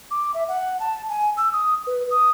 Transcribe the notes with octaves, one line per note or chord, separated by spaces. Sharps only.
D6
E5
F#5
A5
G#5
E6
D#6
B4
D#6